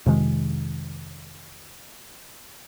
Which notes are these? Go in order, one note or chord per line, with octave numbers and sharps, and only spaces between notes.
F2 C3 D#3 G#3